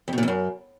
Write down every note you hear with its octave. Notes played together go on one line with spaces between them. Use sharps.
F2
B2
A#2
F2
F#2